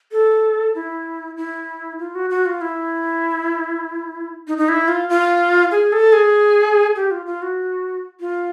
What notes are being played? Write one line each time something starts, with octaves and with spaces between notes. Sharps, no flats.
A4
E4
E4
F4
F#4
F#4
F4
E4
D#4
D#4
E4
F4
F4
G#4
A4
G#4
G4
F4
F4
F#4
F4